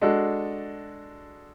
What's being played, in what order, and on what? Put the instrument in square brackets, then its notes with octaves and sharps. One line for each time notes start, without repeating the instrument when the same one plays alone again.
[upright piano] G#3 D4 F#4 A4